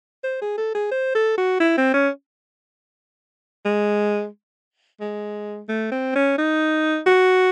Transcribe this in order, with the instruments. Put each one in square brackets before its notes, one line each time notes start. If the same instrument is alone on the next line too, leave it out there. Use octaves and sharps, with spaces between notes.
[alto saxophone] C5
G#4
A4
G#4
C5
A4
F#4
E4
C4
C#4
G#3
G#3
A3
C4
C#4
D#4
F#4